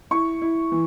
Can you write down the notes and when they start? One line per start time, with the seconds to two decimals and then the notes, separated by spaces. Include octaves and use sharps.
0.11 E4 C#6
0.42 E4
0.72 E3